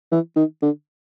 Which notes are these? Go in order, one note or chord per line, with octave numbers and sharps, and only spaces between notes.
E3
D#3
D3